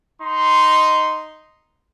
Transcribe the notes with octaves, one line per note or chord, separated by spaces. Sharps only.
D#4 C6